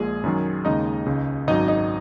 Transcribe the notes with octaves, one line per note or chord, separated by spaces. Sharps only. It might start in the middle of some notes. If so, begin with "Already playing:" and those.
Already playing: A#1 A#2 G#3 G#4
F#2 D#3 F#3
D#2 C#3 G#3 D#4 D#5
C#2 C#3 G#3
G#1 F#2 F#3 D#4 D#5
D#4 D#5